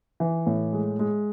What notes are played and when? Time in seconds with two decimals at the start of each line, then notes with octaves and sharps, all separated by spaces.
0.20 E3
0.47 A2
0.73 G#3
0.99 G#3